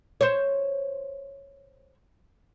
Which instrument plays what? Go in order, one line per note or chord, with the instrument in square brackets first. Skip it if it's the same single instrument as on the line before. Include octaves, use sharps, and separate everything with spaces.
[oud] C5 C#5